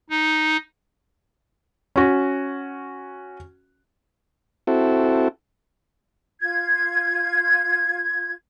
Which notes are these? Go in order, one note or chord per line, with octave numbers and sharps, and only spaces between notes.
D#4
C#4 F#4
C4 E4 F#4 A4
F4 G#6